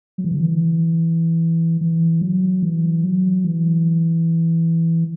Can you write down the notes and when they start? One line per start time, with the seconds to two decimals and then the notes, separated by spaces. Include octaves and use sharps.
0.18 F#3
0.24 E3
0.31 D3
0.40 E3
1.81 E3
2.21 F#3
2.63 E3
3.04 F#3
3.44 E3